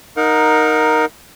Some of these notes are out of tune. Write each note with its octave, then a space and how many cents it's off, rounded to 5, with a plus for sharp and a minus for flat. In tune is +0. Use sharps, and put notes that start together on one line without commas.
D#4 +0 A#4 +0 F#5 -40